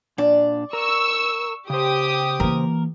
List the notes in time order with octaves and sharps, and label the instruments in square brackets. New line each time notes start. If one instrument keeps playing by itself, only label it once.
[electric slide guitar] A#2 D4 [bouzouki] D5
[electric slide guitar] A#4 [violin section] C#6 E6
[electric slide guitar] C#3 C5 [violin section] G4 D#6
[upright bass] E3 A#3 [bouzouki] A#4